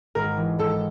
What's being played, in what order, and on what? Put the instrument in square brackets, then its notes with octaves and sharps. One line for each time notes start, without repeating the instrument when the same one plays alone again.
[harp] G#1 [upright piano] A#4
[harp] E3
[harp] G#1 [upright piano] A4